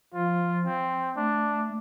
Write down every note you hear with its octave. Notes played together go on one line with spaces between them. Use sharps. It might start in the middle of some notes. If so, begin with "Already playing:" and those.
F3 F4
C4
A3 D4